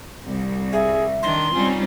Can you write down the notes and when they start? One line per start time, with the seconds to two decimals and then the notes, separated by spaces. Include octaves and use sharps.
0.25 C2
0.73 G#4 E5
1.23 D#3 D4 C6
1.54 G3 C4 C#4 D#4 F4 G#5